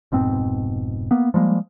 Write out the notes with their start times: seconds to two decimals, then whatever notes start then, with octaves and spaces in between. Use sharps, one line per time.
0.12 F1 G#2 B2 C4
1.11 A#3 B3
1.34 F3 G3 G#3 A#3